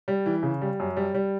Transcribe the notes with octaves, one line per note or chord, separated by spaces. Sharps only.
G3
E3
C#3
G3
F#2
G3
G3